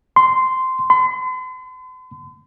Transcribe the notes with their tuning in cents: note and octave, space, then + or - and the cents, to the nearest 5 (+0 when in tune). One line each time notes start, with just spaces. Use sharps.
C6 -10
C6 -45